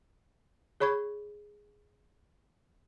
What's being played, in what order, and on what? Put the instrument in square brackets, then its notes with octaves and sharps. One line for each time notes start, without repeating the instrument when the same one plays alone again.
[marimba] G#4 C#5 B5 C#6 G#6